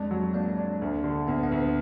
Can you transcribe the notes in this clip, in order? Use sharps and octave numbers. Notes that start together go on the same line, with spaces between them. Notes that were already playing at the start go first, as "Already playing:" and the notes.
Already playing: F2 G#3 D4
F#3
A#3 D4
D4
D2
D3
D2 B3
B3
D2